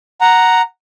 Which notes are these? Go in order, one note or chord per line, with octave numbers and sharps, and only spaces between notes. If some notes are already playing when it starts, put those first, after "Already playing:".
F#5 A#5